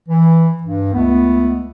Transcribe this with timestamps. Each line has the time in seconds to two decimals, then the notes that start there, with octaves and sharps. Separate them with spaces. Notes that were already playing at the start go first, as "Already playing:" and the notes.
0.09 E3
0.63 G2
0.94 C#2 A3 B3